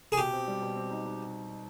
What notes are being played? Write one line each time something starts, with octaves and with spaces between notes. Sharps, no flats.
G#4
B2 G4
C4
G3
B2
C4
D#4
D#4